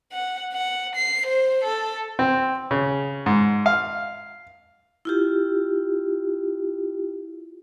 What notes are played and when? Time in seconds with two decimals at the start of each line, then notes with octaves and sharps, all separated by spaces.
0.12 F#5
0.53 F#5
0.96 C7
1.27 C5
1.64 A4
2.19 C4
2.71 C#3
3.26 G#2
3.66 F5
5.05 E4 F4 G4